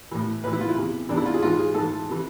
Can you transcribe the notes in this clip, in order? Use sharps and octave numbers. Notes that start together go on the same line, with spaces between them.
A2 E3
A2 E3 B4
E4
F4
E4
E2 C3 E3
E2 C3 E3 D4
E4
F4
G#4
G#2 E3 F4
G#4
G#2 E3 A4
C3 E3